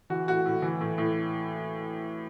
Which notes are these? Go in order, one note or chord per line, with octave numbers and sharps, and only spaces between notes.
E3 F#4
A2 F#4
A2
E3
A2
A2